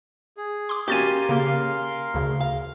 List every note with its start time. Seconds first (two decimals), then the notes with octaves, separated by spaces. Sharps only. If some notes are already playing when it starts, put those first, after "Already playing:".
0.37 G#4
0.69 C6 D6
0.88 C#4 F#4 G4 A#4 F5 C6 A6 D#7
1.29 C#3 A#3
2.14 D2 C#3
2.41 F5